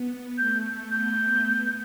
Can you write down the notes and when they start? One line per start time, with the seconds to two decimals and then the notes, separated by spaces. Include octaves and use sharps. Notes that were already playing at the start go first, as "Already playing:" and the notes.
Already playing: B3
0.38 A3 G6
0.91 B3 G6
1.45 B3